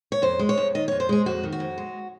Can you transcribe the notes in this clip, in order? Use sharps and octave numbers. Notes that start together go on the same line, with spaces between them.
C#5
F2 C5
G#3
C#5
F2
D#3 D#5
F2 C#5
C5
G#3 G#4
F2 F#4
D#3
F#4
F2
G#3